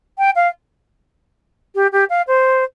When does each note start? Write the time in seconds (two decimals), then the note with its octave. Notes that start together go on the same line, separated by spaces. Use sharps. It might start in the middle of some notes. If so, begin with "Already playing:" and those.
0.18 G5
0.36 F5
1.75 G4
1.92 G4
2.10 F5
2.28 C5